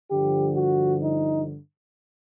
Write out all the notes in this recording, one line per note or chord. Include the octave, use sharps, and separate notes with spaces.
G2 D3 F3 G4
F#4
D#4